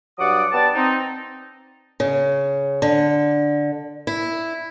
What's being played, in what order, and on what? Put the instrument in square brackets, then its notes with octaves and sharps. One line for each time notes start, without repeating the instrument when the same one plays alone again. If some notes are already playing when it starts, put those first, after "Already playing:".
[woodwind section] G2 F#3 D5 F#5 D6 D#6
B3 G4 D5 A5
C4 D#4
[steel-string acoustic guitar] C#3
D3
E4